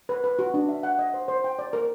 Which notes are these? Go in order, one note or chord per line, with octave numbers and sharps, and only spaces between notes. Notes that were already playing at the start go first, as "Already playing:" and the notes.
B4
B4
F#4
D4
E5
F#5
D#5
C5
C5
G5
D5
A#4